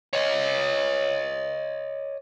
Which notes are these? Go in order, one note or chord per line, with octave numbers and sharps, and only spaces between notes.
C#5 D#5